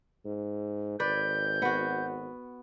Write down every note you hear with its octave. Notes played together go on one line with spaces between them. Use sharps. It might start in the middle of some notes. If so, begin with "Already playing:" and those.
G#2
G#1 B4 D5 G6
B3 F#4